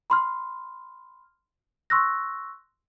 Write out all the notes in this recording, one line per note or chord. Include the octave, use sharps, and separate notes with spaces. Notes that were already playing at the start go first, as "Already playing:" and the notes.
B5 C6 F6
C6 C#6 E6 F#6 A#6